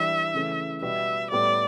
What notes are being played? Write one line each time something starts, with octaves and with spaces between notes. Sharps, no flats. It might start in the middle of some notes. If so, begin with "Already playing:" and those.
Already playing: E3 G3 D4 E5
C#3 E3 A3 C#4
B2 G3 B3 F#4 E5
A2 G3 B3 D5